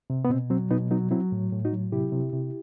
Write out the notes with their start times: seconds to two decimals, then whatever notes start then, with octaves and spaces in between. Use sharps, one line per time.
0.10 C3
0.25 B3
0.30 B2 C4
0.50 F#3 C4
0.70 B2 B3 D#4
0.91 F#3 B3 D#4
1.11 F#3 C4 E4
1.32 A2
1.52 A2
1.65 D#4 F#4
1.73 F#3
1.92 C3 E4 G4
2.12 C3
2.32 C3